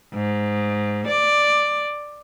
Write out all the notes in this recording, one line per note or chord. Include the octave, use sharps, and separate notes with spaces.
G#2
D5